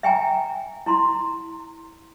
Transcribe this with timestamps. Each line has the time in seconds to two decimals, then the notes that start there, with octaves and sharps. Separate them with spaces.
0.03 E5 G5 G#5 A#5
0.86 E4 A#5 C6